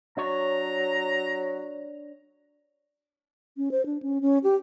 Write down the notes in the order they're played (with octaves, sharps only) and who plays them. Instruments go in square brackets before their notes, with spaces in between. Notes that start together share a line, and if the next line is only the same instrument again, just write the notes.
[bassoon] F#3 [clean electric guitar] D4 C#5 [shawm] A#5
[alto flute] C#4
C5
D4
C#4
C#4
G4